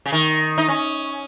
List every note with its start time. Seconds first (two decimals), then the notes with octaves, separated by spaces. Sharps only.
0.06 C#3
0.12 D#3
0.58 D#4
0.68 C#4